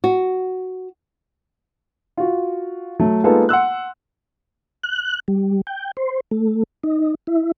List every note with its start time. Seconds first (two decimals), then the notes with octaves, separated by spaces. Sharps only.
0.04 F#4
2.17 F4 F#4
2.99 F#3 A3
3.24 G#3 A#3 B3 D#4 F4 A4
3.49 F#5 C6 E6 F#6
4.84 F#6
5.28 G3
5.67 G5
5.97 C5
6.31 A3
6.83 D#4
7.27 E4